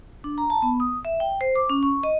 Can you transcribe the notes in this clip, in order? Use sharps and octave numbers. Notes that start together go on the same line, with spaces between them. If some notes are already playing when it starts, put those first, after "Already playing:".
D4
A#5
A5
B3
D#6
E5
G5
C5
D6
C#4
C#6
D#5